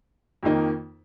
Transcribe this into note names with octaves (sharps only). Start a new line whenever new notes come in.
F2 D#3 A#3 D#4